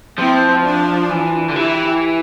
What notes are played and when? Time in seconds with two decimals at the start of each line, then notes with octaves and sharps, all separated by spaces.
0.18 F3 C4 E4
0.64 D4 F4
1.10 E3
1.49 D3
1.55 E3 E4 G4